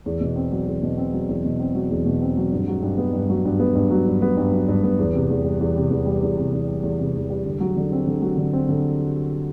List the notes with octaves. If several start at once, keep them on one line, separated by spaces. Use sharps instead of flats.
E2
B2
C4
F#3
E2
B2
C4
F#3
E2
B2
C4
F#3
E2
B2
C4
F#3
G2
F#3
G2
B3
G2
F#3
G2
B3
G2
F#3
G2
B3
G2
F#3
G2
B3
E2
C3
E2
G3
E2
C3
E2
G3
E2
C3
E2
G3
E2
C3
E2
G3
D3
F#3
D3
C4
D3
F#3
D3
C4
D3